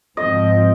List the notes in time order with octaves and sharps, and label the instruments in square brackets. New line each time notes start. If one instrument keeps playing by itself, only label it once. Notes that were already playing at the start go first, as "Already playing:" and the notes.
[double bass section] G#2 F3 C4 [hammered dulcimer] D#5